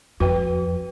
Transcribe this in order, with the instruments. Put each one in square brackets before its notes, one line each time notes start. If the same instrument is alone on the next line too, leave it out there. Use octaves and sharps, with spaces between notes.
[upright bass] F2 [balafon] F#4 B4 G5